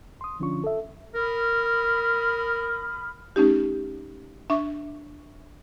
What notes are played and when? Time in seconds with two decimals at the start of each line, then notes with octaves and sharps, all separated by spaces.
0.21 C6 D#6
0.40 D3 F3 C#4 D4 F4 C#6
0.64 A4 E5
1.14 A#4 B5 D#6 F6
3.36 A3 C#4 D#4 G4
4.50 D4 E5 C#6